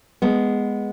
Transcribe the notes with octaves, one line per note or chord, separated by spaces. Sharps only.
G#3 B3